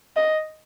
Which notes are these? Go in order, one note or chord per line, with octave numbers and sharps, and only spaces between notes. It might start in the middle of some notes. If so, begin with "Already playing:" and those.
D#5